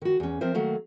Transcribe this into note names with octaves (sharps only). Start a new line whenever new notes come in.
D#3 F#4
E2 C#4
F3 C4 A#4 C5 E5
D#3 F#3 A3 A#3